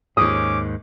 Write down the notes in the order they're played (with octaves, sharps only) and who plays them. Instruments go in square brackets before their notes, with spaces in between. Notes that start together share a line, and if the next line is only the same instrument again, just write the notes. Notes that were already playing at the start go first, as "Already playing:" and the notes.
[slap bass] D#2 G#2 [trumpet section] C#4 D6 [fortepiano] D#6